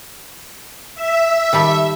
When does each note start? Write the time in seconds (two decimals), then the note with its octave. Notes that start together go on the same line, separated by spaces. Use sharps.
0.95 E5
1.53 D#3 G3 A4